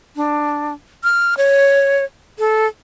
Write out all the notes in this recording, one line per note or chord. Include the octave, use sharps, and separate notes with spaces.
D4
F6
C#5
A4